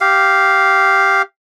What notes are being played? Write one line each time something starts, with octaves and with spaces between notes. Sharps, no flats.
G4 F5